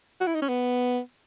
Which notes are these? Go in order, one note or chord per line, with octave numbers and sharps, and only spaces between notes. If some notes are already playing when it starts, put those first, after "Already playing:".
F#4
E4
D#4
C#4
B3